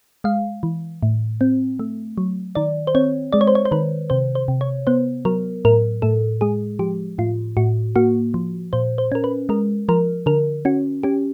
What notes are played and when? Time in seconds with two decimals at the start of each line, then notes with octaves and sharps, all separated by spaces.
0.24 G#3 F5
0.63 E3
1.03 A2
1.41 C4
1.79 A3
2.18 F#3
2.55 D#3 D5
2.87 C5
2.95 C4 C#5
3.33 G#3 D5
3.41 C#5
3.47 C5
3.55 C#5
3.65 C5
3.72 D#3 B4
4.10 C3 C5
4.35 C5
4.48 C3
4.61 C#5
4.87 B3 C5
5.25 F#3 A#4
5.65 A2 A#4
6.02 A2 A4
6.41 G#3 G#4
6.79 F3 G4
7.18 A2 F4
7.57 A2 F#4
7.96 A#3 F#4
8.34 F3
8.73 A#2 C5
8.98 C5
9.12 C#4 A#4
9.24 B4
9.49 G#3 A#4
9.89 F3 A#4
10.26 D3 A#4
10.65 C#4 F#4
11.03 C#4 G4